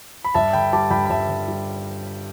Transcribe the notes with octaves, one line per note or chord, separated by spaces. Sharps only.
B5
G2 E5 A5
D3 G5 B5
G3 A5 D6
G2 G5 B5
B5
G2 E5 A5
D3
G3